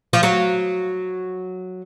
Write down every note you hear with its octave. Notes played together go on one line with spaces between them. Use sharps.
F3
F#3